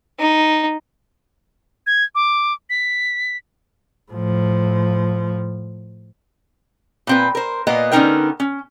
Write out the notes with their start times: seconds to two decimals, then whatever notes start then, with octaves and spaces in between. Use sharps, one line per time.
0.19 D#4
1.87 G#6
2.15 D6
2.70 B6
4.12 A2 F3
7.07 A#2 C4 B4
7.35 A#4 C5
7.67 A#2 A#3 B3 D#5
7.92 D3 B3 C#4 D#4 A#4 G5
8.40 C#4